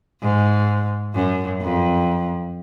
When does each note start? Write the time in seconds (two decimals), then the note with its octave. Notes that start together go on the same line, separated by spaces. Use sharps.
0.22 G#2
1.15 F#2
1.61 F2